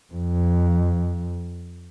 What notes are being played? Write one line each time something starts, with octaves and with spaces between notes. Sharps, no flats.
F2